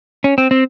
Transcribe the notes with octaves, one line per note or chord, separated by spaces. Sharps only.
C#4
C4
C4